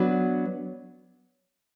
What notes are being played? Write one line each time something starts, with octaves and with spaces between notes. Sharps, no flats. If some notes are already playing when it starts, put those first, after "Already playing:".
Already playing: F#3 B3 D4 F#4 B4